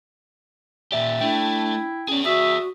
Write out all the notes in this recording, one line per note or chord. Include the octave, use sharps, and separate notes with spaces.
A#2 G4 D5 E5
A3 D4 E4 G5
C#4 G#4 D5
F#4 E5 D#6